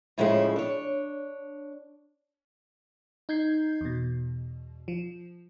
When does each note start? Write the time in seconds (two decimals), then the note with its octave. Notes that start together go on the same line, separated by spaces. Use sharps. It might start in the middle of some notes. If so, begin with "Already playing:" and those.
0.18 A2 C#3 F3 G#3 A3 E4
0.56 D4 C#5
3.29 D#4 G6 G#6 C7
3.81 E2 B2
4.88 F3